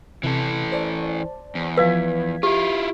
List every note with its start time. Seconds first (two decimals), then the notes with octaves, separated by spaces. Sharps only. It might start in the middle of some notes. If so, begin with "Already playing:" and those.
0.23 C3 E3 A4
0.72 C5 D5 A5
1.55 E2
1.77 F3 B4 F5 G#6 B6
2.43 E4 F4 G4